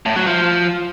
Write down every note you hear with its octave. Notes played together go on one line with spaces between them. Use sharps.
A2
F#3
F3